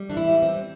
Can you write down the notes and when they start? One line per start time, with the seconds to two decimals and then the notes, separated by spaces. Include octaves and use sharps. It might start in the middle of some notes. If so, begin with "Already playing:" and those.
Already playing: G3
0.10 E3 D4
0.17 E4
0.30 G3
0.42 C4
0.48 G3